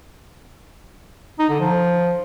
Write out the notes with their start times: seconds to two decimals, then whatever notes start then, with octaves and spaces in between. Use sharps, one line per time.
1.39 D#4
1.49 D3
1.60 F3